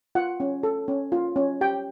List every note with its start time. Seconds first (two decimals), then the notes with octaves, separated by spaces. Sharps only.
0.15 F4 F#5
0.40 C#4
0.63 A4
0.88 C#4
1.12 F4
1.36 C#4
1.61 G4 G5